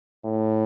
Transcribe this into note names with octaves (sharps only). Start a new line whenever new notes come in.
A2